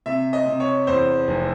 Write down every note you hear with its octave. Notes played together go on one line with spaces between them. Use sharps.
C3 E5
D#5
C3
C#5
E2 C5
F1